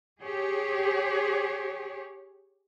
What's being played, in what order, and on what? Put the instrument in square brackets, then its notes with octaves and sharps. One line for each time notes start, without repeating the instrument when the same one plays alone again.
[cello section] G4 G#4 C#5